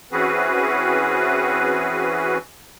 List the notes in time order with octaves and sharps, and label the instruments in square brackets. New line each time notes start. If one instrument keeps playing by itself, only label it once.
[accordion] E3 C4 C#4 F#4 G#4 B4